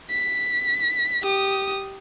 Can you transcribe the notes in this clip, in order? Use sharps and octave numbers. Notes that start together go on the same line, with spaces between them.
B6
G4 D#6